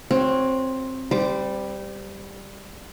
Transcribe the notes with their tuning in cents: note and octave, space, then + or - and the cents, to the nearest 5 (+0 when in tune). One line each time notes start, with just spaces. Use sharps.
C4 +10 F#4 -20 C#5 +0
G3 +5 C5 -25 D6 +5